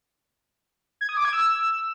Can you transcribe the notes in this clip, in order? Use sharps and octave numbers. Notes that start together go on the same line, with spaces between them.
G#6
D#6
D6
G#6
E6